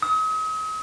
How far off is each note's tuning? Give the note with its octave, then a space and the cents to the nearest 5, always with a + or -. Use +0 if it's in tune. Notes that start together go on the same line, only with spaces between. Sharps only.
D#6 +40